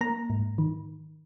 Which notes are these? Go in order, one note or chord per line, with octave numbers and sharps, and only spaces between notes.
A#3 A#5
G#2
D#3